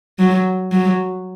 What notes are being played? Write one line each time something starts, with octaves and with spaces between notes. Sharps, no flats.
F#3
F#3